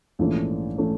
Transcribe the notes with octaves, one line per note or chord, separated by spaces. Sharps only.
A#1 G#2 E3 A3 C#4
E3 A3 C#4